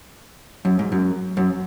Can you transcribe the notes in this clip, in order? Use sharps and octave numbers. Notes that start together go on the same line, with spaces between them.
F#2
G#2
F#2
F#2